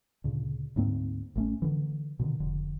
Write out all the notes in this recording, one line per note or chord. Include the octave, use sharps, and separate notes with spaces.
D2 A#2 C#3
D2 G#2 A#3 C4
A1 A3 C#4
D3 E3
B2 D3 D#3
F1 D3